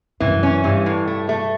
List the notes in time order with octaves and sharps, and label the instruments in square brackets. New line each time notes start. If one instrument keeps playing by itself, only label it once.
[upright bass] F#2 [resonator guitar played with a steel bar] E3
[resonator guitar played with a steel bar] C#4
[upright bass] G2 [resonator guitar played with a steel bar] E3
[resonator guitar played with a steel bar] A2
A3
A3